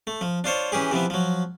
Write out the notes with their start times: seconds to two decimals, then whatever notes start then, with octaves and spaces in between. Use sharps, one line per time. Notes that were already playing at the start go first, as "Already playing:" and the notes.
0.07 A3
0.21 F3
0.44 D4 F4 C5 C#5
0.72 E3 C#4 G4 G#4
0.92 C3 E3 F3 B3
1.10 F3 F#3